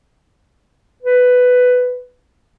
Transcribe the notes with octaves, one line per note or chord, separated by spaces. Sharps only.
B4